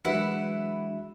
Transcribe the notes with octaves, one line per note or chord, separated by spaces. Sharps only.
E3 F#3 G#3 D4 E4 F#4 B4 F#5